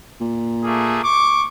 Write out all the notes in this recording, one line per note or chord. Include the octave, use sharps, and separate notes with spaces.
A#2
A3 A#3 G#4
C#6 D6